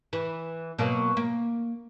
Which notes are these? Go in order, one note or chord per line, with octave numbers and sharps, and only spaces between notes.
E3
B2 F#3 A#3
A#3